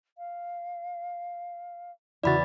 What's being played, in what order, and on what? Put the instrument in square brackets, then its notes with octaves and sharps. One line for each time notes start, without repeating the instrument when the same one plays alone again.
[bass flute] F5
[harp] E2 C#3 E5 [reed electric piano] E4 F#4 [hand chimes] D5 B5 A6